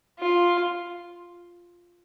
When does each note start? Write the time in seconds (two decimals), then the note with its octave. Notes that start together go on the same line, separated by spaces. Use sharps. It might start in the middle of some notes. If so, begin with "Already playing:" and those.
0.19 F4